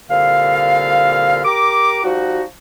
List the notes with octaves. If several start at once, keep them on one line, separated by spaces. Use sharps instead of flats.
C2 A#2 D3 F5
G4 A#4 A#5 D6
F3 G3 D#4 F#4